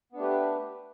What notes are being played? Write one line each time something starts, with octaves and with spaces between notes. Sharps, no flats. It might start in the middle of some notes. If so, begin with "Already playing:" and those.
A3 B3 D4 G4 B4